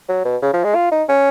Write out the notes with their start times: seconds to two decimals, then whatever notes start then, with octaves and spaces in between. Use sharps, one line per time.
0.09 F#3
0.25 B2
0.42 C#3
0.53 F3
0.64 G#3
0.75 F4
0.92 D#4
1.09 C#4